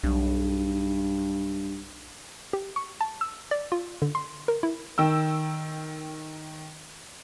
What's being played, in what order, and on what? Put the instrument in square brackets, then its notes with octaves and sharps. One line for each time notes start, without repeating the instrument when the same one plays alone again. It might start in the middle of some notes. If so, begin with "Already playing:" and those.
[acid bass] B1 [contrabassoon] G2
[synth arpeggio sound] G4
C#6
A5
E6
D5
F4
D3
C6
A#4
E4
[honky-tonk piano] D#3 G5 E6